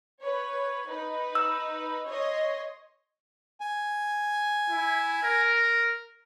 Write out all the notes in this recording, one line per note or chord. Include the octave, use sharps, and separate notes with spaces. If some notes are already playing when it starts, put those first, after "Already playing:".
B4 C#5
D#4 B4
E6
C#5 D#5 C6
G#5
E4
A#4